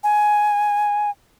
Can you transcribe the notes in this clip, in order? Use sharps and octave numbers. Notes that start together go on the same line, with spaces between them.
G#5